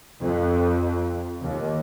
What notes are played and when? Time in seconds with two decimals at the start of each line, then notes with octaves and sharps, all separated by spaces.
0.21 F2
1.42 D#2